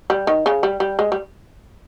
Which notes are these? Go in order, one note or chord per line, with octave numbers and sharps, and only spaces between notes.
G3
D#3
C#3
G3
G3
G#3
G3